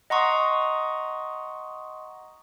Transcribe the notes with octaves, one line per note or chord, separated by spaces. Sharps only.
D#5 F#5 A#5 C6 C#6 D#6